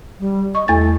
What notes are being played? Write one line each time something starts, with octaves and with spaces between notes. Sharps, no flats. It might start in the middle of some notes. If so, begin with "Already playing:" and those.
G3
D#5 C#6
E2 A3 A6